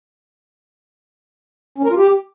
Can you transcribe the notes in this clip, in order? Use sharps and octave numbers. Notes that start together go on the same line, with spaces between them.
C#4
A#4
F4
G4